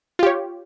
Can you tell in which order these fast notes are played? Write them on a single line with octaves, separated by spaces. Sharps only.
F4 G4 C#5